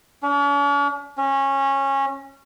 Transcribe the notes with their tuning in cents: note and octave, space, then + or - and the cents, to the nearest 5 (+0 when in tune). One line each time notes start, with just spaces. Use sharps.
C#4 +45
C#4 -20